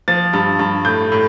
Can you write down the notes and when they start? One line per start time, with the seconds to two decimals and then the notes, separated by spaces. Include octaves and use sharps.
0.08 F3 A6
0.33 G2
0.59 G2
0.85 A2 G6
1.12 A2